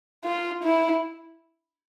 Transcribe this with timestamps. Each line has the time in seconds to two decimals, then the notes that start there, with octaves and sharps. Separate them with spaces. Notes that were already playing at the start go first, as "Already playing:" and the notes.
0.24 F4
0.63 E4